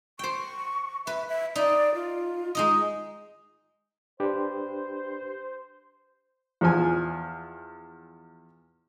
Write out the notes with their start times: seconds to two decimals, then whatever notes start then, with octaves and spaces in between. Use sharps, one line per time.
0.19 C5 G5 C#6
1.07 B4 E5
1.28 E5
1.55 D#4 D5
1.94 F4
2.55 G#3 D#4 D#5
4.20 D4 G4 B4 C5
6.61 E2 F3 G#5